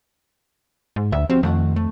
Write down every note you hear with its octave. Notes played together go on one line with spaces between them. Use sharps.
G#2
D2 E5
F3 C4 F#4 G4
F2 D#3 A3 F#5
A3